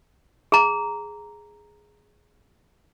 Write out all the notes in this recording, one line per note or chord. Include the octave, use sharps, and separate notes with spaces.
G#4 A#5